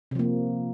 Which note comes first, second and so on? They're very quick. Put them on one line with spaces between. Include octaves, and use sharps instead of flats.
C3 F3 A#3